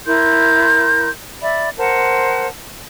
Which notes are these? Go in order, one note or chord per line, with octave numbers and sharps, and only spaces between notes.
E4 A#4 C6 G6
D5 E5 B5
A#4 C5 F#5 A5